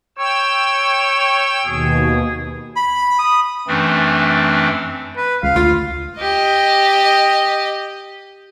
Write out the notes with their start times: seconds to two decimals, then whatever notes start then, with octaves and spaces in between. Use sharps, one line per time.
0.18 C#5 G5 E6
1.66 D#2 B2 G#4
2.76 B5
3.19 D#6
3.68 F#2 E3 A3 C4 D4
5.17 B4
5.43 C#2 F5
5.56 D2 F4
6.18 G4 D#5